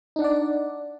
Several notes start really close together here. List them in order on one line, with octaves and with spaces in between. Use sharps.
D#4 D4 F#5 D5